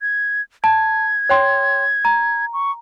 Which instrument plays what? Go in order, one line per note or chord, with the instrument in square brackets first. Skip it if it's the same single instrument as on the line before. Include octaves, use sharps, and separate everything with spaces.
[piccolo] G#6
[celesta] A5 [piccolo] G#6
[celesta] C#5 G5 C6
A#5
[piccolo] C#6